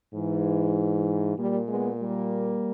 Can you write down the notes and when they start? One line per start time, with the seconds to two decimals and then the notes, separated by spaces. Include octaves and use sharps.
0.15 G#2 E3
1.37 A#2 G3 A#3
1.68 G#3 B3
1.99 G3 A#3